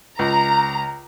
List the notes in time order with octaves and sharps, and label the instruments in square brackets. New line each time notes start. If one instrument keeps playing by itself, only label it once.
[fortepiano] C#2 [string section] A#5